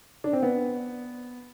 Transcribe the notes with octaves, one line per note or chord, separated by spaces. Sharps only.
D4
C4
B3